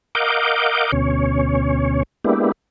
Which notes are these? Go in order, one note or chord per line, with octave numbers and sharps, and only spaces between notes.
A#4 D#5 F5 F#5 D6 G6
D2 B2 C#4 C#5
G#3 A#3 B3 D4 E4 G4